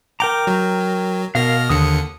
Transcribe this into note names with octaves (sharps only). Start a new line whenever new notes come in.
A#4 G5 A#5 D6
F#3
B2 A#4 F5 F6 A#6
D#2 D3 D#6 C#7